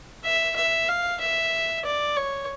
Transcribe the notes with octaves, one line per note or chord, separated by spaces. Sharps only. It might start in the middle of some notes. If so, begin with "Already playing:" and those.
E5
E5
F5
E5
D5
C#5